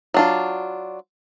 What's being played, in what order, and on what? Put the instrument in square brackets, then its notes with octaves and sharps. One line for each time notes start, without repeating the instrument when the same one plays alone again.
[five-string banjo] F#3 D4 F4